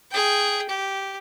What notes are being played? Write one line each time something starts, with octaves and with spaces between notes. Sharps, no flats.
G#4 G5
G4